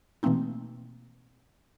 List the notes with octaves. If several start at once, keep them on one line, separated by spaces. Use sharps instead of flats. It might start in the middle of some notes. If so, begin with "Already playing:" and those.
B2 E3 A3 A#3 C4 D#4